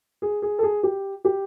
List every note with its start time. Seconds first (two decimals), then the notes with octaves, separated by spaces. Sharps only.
0.22 G#4
0.42 G#4
0.59 A4
0.63 G#4
0.83 G4
1.25 G4